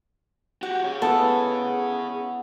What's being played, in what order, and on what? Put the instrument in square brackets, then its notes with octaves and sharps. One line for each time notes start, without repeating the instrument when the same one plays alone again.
[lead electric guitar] F#4 G4 [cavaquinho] F#5
[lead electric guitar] G#4 C#5
[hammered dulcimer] B3 E4 [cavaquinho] A4 A5